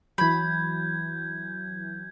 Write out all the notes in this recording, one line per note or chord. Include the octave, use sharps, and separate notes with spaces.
E3 F#3 B5 G6 G#6